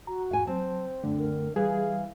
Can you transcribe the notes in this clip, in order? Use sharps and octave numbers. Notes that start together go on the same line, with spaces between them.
F#4 A#5
E2 G#2 F5 G#5
F#3 C4 C5 A5
C#2 F#2 D3 A3
A#4
E3 G3 G#4 F5